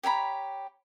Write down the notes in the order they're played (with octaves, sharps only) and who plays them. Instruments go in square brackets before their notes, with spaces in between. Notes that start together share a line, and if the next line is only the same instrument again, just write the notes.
[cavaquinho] G4 C#5 A#5 B5